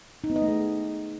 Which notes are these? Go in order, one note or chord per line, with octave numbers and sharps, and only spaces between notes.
D#4
B3
D#5
A3
G#4